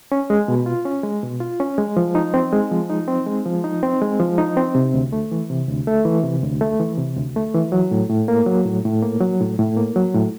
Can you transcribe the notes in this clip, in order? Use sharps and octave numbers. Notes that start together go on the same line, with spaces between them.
C#4
G#3
B2
F4
C#4
G#3
B2
F4
C#4
G#3
F3
D#4
C4
G#3
F3
D#4
C4
G#3
F3
D#4
C4
G#3
F3
D#4
C4
C3
D2
A3
E3
C3
D2
A3
E3
C3
D2
A3
E3
C3
D2
A3
E3
F#3
A2
A2
A#3
F#3
A2
A2
A#3
F#3
A2
A2
A#3
F#3
A2